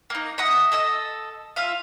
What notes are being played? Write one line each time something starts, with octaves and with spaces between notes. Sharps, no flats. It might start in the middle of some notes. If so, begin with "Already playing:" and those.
A#3 D#4
D#5 E5 F#5 D#6
A4 D#5 E6
F4 E5 F5